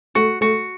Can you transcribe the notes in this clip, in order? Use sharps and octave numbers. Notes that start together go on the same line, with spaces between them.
A3 F#4
A3 F#4